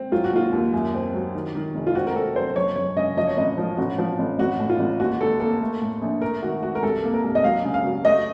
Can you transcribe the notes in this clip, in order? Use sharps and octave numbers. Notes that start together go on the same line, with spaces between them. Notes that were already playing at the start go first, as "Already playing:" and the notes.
Already playing: C4
F#3 F4
F#4
D#2 F4
D#2
F#2
C4
F#3
D#3
D#3
F1
F4
C4 F#4
A#4
C4 A4
F#3 C5
F#1 C#5
F#1 C#5
C#3 D#5
F3 D#5
C#5
A1 D#5
F3
A1 F#4
F3
A1
A1 F#4
A2
F4
A1
D#2 F#4
D#2 A4
A#3 A4
A3
A2
A#1
A3 A#4
D#3 F#4
A3 F#4
A#4
C2 A4
A#3
A#4
C2
D#5
F#3 F5
C#3
F5
F#3
A3 D#5